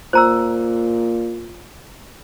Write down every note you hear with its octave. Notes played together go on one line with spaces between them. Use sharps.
A#2 C5 A#5 E6